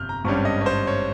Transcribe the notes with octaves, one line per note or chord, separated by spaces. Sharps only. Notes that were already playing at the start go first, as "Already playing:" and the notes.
Already playing: G1 F2 C3 F6 G6
A#5
G#1 G2 G3 C#4 C#6
D#5
C#5
C5
C#5